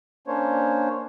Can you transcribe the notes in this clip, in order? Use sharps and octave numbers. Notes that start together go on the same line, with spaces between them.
A#3 C#4 D4 C5 C#5